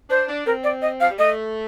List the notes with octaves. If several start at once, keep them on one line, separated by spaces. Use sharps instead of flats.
D4 C5
D4
C4 A#4
D5
D#5
F3 F5
G3
A3 D#5